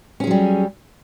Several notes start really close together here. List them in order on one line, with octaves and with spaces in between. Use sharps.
C#4 G#4 F#3 G3